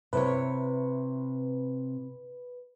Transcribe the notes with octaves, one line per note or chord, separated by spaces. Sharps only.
C3 E4 B4 C#5